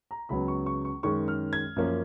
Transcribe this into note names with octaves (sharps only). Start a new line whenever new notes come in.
A#5
C#2 C#3 F#3 B3 B5
C#6
C#6
C#6
F#2 D#3 G#3 C#4 C#6
F6
G#6
F#2 F3 A#3 C#4